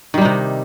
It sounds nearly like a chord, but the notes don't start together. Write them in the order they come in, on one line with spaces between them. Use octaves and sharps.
D#3 G3 D#4 C3